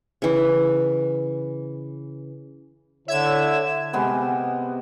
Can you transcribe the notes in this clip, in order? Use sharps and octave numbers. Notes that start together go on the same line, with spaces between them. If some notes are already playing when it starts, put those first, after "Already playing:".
C#3 E3
D3 E4 C#5 E5 G#6 E7
C3 G#3 B3 G#5